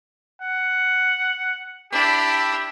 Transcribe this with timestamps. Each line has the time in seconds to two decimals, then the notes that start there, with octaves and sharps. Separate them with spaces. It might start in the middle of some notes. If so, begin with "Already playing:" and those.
0.42 F#5
1.92 D4 E4 G4